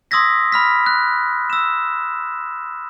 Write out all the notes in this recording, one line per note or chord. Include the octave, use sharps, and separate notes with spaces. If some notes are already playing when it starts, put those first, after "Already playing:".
C6 D#6 E6 G#6 A#6 B6
B5 F6 B6
F#6
E6 E7